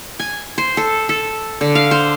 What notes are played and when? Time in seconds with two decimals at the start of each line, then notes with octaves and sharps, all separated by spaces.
0.20 G#5
0.58 C5
0.77 A4
1.09 A4
1.61 D3
1.75 F5
1.91 C5